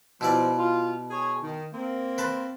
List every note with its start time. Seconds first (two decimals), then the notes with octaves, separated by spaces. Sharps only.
0.21 B2 F3 E4 D5
0.57 F4
1.10 G#4 C#5
1.42 D#3
1.74 A#3 C4
2.18 B4 C5 A5